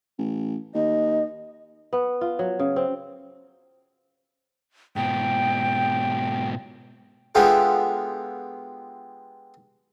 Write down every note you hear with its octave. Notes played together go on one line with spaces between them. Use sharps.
A1
D#2 D#5
B3
F4
F#3
C#3
C4
G#2 B2 G5
G#3 B3 D4 F4 G4 A4